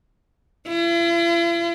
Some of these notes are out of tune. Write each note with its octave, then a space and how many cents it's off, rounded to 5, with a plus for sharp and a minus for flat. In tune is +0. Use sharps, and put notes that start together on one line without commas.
E4 +45